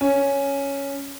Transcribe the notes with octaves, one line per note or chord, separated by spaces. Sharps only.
C#4